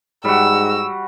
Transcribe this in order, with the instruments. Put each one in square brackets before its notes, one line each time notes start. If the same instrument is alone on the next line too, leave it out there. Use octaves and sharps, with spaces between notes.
[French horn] G#2 [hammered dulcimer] G3 F#4 [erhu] E6